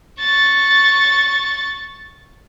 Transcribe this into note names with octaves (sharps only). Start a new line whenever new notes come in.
C#6 A6